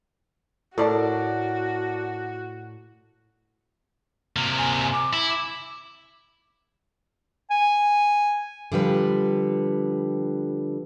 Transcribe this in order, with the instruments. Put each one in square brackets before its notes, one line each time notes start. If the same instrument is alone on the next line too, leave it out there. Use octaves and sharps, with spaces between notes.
[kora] A2 [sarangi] F#4 [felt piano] A#4 D5 A5
[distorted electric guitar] C3 A#3
[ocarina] G#5
D6
[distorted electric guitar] E4
[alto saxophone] G#5
[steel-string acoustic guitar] D3 F3 G3 B4